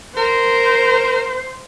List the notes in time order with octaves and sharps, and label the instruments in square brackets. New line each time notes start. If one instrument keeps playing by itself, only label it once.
[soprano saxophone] A#4 [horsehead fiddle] C5